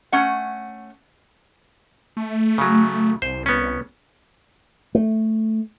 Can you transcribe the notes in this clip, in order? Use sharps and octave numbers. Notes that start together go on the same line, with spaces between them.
A3 C#4 F#5
A3
C#3 F#3
C2 C5
B3 C#4
A3